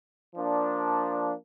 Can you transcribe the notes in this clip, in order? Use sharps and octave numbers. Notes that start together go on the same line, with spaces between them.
F3 A#3 D4